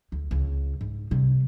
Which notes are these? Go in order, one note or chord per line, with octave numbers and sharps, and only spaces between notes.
D2
C#2
G#2
C3 G3